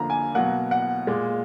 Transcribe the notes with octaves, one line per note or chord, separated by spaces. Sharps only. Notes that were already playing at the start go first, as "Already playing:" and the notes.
Already playing: D3 F3 A#3 A#5
G#5
B2 F#3 A#3 F#5
F#5
A#2 G#3